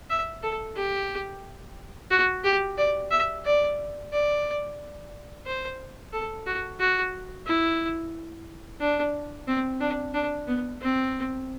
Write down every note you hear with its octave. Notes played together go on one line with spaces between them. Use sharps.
E5
A4
G4
F#4
G4
D5
E5
D5
D5
C5
A4
F#4
F#4
E4
D4
C4
D4
D4
B3
C4